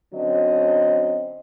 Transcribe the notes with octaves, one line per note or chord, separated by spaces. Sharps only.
D3 F#3 C4 C#4 D#5